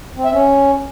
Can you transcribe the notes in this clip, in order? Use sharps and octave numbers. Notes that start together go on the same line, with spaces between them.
C4
E5
C#4